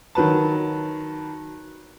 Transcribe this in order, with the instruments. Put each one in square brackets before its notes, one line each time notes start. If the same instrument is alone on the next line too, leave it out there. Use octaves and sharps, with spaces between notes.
[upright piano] D#3 F#3 B4 A5